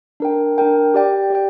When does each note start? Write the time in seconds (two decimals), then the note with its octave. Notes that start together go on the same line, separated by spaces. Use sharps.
0.20 D4 A#4 G5
0.58 D4 A#4 G5
0.94 G4 D5 G5
1.30 G4 D5 G5